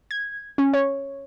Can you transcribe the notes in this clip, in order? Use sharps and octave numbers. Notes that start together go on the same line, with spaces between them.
G#6
C#4
C#5